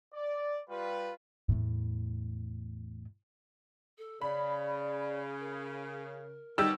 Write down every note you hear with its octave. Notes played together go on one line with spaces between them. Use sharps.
D5
G3 F4 B4
E2 A2
A4
C#3 D5 B5
A#4
B2 G3 D#4 G4 C#5 E6